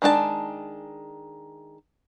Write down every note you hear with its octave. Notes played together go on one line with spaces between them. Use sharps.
D#3 G#3 D4 F4 A5